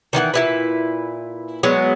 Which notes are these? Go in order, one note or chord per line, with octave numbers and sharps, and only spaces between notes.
D#3 E3 D#5 F#5
A#2 E4 B4
F#3 G#3 B3